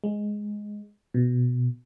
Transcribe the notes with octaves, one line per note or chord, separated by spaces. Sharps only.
G#3
B2